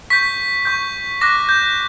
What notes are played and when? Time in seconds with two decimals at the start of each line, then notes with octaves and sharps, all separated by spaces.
0.10 C#6 G6 B6
0.65 C#6 G6
1.21 D6 F#6 A#6
1.49 G6